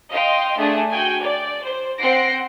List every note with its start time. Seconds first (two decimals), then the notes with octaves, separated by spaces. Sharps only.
0.13 D#5 F5 G5 C6
0.59 A3 D4 G#4 A5
0.91 F#4 G5 G#5
1.23 D5
1.65 C5
2.01 C4 C5 F#5 A#6 C7 D7